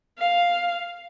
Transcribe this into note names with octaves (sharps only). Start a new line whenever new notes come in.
F5